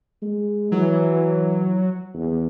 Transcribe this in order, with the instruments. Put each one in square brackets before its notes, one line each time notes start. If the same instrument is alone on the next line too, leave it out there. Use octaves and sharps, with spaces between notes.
[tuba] G#3
[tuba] E3 [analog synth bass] F#3
[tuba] E2